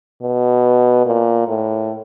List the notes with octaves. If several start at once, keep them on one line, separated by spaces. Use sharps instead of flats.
B2
A#2
A2